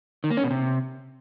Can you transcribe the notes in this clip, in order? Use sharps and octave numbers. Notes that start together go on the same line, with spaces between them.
D#3
A#3
C#4
B2
C3